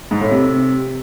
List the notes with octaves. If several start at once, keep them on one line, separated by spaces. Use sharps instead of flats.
G#2
A2
C3